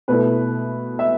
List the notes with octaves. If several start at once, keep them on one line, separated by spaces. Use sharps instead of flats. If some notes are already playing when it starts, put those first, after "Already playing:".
B2 A3 E4 B4
E5